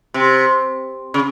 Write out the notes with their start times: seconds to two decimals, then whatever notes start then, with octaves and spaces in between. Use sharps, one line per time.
0.14 C3
1.14 C#3